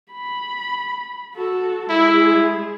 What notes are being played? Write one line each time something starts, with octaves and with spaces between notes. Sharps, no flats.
B5
F#4 A4
G#3 E4 G#4